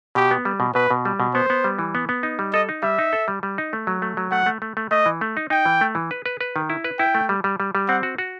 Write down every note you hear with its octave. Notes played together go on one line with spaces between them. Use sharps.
B2 G4
B3
G3
B2
B2 B4
B2
G3
B2
B3 C5
B3
G3
E3
B3
B3
D#4
G3
A4 D#5
D#4
G3 E5
D#4
A4
G3
G3
D#4
A3
F#3
A3
F#3
A3 F#5
A3
A3
A3
A3 D#5
E3
A3
D#4
D#4 G5
E3
A3
E3
B4
B4
B4
D#3
E4
B4
E4 G5
A3
G3
G3
G3
G3
C4 F#5
F#4
F#4